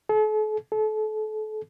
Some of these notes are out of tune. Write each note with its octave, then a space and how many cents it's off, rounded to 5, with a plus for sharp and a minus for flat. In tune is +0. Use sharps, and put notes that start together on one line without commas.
A4 -45
A4 -35